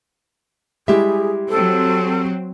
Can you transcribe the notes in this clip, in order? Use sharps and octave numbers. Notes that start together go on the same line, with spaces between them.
G3 G#3 E4 G4 G#4 E5
F#3 C4 A4